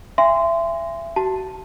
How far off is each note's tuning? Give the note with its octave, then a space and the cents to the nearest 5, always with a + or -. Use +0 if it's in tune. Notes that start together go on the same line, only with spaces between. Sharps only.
E5 +30 G#5 -35 C6 -20
F#4 +35 A5 +0